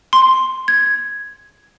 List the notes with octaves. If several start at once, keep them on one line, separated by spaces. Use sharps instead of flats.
C6
G#6